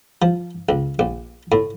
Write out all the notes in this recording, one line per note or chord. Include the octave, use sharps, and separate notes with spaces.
F3
C#2
A#1
A2